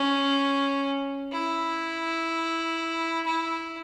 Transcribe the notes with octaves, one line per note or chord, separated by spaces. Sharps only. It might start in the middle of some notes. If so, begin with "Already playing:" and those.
Already playing: C#4
E4
E4